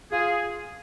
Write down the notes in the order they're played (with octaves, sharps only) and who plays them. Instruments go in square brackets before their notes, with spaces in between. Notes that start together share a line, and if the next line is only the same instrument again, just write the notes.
[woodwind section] F4 G#4